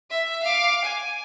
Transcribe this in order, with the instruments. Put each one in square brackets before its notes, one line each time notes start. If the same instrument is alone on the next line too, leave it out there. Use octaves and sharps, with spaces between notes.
[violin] E5
F5 D6
G#5